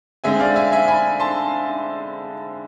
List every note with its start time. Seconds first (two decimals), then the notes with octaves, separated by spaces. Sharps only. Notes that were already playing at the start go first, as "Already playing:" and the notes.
0.24 D3 G#3 C4 E5 G#5
0.40 D5 F5
0.56 E5 G#5
0.72 E5 G#5
0.88 G#5 B5
1.20 A5 C6